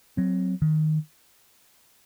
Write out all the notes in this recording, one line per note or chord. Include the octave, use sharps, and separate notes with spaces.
F#3 C4
D#3